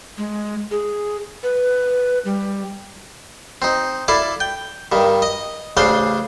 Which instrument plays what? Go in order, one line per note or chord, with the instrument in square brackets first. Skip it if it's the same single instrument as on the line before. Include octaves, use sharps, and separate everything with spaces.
[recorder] G#3
G#4
B4
G3
[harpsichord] C4 D#4
E4 A4 D5 F5
G5
G2 D#3
D#5
A1 C#3 D4 C5 F5 C6